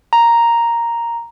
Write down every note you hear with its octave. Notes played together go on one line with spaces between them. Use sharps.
A#5